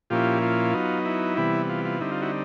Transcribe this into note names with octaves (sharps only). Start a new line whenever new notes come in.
A#2 F3 A#3 C#4 E4 F4 G4
F4
F#3 B3 D#4
E4
C3 E3 G3 B3
F4
F4
D3 G3 C4 D#4 E4
F4
E4 F#4